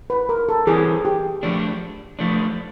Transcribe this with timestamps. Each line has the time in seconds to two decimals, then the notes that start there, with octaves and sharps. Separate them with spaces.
0.10 B4
0.29 A#4
0.49 A4
0.67 E3 G3 C4 G#4
1.05 G4
1.43 F3 A3 D4
2.19 F3 A3 D4